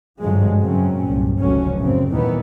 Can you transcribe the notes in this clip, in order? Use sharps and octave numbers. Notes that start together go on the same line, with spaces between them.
G#1 G2 D3 F3 F#3 G#3
F#2 C#3 F#3 C4 C#4
C2 G2 A#2
F1 C#2 A2 D3 F#3 C#4
F#2 A2 C#3 C4
D#2 A#2 D#3 E3 G3 B3